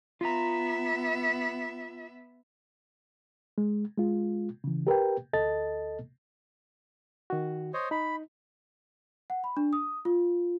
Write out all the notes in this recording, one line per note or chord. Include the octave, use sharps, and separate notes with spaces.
B3 F4 E5 A#5
G#3
G#3 F4
C#3 E3
G4 A#4 B4 G5
D2 A4 D#5 A5 A6
D#3 F#4
C5 C#5 D#5
D#4 B5
F#5
B5
D4
D#6
F4